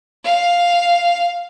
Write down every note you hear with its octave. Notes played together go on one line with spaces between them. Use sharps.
F5